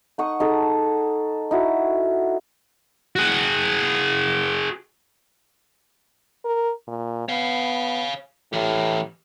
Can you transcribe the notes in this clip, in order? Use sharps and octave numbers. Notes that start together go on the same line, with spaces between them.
D#4 F#5 C#6 D#6
D#4 G#4 A4
D#4 E4 F#4
F#4 G#4
A#4
A#2
B3 C#5 F5
A2 E3 G4